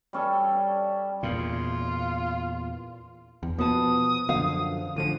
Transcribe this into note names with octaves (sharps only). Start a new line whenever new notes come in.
G3 C#4 A4
E2 A#2 F4
E2
B2 F3 B3 A5 D#6
F#2 D3 F3 F5
A1 D3 F3 D#7